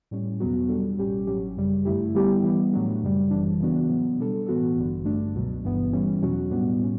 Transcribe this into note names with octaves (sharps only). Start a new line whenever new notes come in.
A2 G3 C#4
E2 B2 F#3 B3 F#4
B2 G3 D4 A4
A1 A2 G3 C#4 G4
A1 A2 F#3 C#4 G4
F#2 C#3 G3
G2 D3 A3 E4 G4
D3 G3 B3 E4 G4
E3 G3 B3
A2 F#3 A3 D4
F#2 C#3 G3
G1 F#2 E3 G3 D4
C#3 E3 B3 D4 F#4
A2 F#3 B3
B2 G3 D4 A4
A2 E3 B3 F#4 A4
A1 G2 D3
G2 D3 A3 D4
C#2 B2 F#3
G1 G2 E3 B3
E3 G3 C#4
E2 B2 F#3 C#4 F#4
A2 G3 B3 D4
A2 G3 C#4